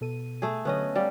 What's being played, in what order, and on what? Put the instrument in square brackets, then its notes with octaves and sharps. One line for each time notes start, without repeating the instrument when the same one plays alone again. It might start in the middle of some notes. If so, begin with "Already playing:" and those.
[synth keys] B2 A4 D#7
[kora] A3 G#4
[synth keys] D3 F#3 [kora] B3 C#4 D#5
[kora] G3 [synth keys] F5 A6